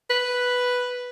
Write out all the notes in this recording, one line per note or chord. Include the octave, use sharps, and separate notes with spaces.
B4